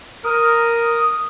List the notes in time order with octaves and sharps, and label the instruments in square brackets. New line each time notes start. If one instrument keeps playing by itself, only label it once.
[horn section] A#4 [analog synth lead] D#6